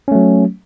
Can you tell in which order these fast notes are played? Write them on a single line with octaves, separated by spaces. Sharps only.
C#4 A3 F#3